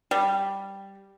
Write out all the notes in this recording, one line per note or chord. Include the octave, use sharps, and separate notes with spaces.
G3